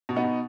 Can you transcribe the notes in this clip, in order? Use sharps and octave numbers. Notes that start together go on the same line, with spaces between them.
B2
B3 D#4
B2